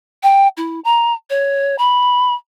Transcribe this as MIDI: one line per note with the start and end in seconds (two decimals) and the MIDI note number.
0.23 0.48 79
0.57 0.80 64
0.84 1.13 82
1.30 1.76 73
1.78 2.34 83